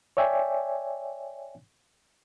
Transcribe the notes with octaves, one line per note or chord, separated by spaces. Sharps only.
C#5 D5 E5 G5 G#5